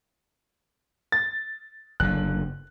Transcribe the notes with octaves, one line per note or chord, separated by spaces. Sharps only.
A6
F#1 D3 F#6